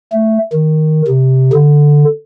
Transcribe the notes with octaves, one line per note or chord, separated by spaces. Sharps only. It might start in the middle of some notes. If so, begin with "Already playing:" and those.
A3
D#3
C3
D3